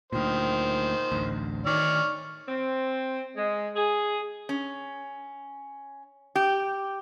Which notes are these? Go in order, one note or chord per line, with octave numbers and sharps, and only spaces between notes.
D2 A#2 D#3 C5
A1 D2
D#3 C#5 D5 F6
C4
G#3
G#4
C#4
G4